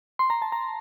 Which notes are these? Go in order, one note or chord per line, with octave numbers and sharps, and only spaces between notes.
C6
A#5
A5
A#5